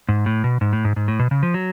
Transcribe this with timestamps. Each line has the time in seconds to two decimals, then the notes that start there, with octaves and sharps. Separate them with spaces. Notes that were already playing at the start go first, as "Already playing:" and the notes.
0.09 G#2
0.26 A2
0.44 B2
0.61 G#2
0.73 A2
0.85 G#2
0.96 G#2
1.08 A2
1.19 B2
1.31 C#3
1.43 F3
1.54 F#3